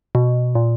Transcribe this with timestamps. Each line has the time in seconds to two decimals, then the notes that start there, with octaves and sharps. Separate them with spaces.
0.15 B2
0.55 A#2